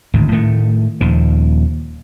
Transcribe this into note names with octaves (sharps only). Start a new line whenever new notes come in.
G#1 D2 A2
A2 D#3 A3
D#1 D#2 D#3 F3